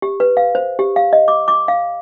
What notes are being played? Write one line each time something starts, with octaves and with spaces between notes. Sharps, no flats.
G4
B4
F5
C5
G4
F5
D#5
D6
D6
F5